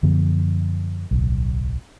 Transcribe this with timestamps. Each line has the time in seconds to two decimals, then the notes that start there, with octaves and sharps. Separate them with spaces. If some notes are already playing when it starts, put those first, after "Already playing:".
0.03 F#2 D3 F3 B3
1.11 D1 B1